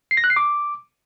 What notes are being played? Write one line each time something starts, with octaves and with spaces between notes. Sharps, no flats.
C7
A#6
F#6
C7
D6